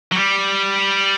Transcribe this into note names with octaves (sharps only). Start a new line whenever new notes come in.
F#3
G3